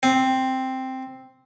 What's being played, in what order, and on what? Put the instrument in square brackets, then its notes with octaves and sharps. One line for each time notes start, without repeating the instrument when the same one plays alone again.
[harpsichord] C4